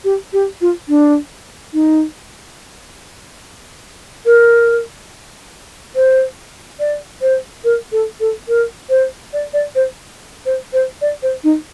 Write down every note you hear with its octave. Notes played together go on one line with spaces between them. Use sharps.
G4
G4
F4
D4
D#4
A#4
C5
D5
C5
A#4
A4
A4
A#4
C5
D5
D5
C5
C5
C5
D5
C5
D#4